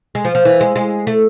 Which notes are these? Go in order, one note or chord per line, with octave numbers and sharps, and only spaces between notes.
G#3
F3
F3
E3
G#3
G#3
A3